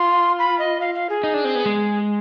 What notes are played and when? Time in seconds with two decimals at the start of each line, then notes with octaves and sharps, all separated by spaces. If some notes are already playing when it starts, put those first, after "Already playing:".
Already playing: F4 C6
0.39 B5
0.59 D#5
0.81 F5
0.95 F5
1.10 G#4
1.24 D#4
1.34 D4
1.45 C4
1.55 B3
1.66 G#3